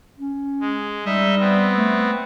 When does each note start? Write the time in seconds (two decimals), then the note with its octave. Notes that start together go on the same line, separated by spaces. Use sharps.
0.18 C#4
0.60 G#3
1.05 G3 D#4 D#5 E5
1.39 B3 C4
1.76 A3